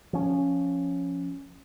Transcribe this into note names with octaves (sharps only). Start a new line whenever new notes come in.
F3 C#4